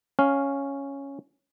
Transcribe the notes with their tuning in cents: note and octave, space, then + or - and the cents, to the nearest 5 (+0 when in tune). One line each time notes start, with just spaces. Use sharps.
C#4 -5 F5 +0